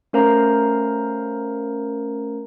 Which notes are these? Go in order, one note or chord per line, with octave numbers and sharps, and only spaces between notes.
A3 C#4 A#4 C5 F5 A#5